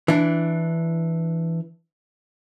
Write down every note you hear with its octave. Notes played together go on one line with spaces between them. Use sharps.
E3 D4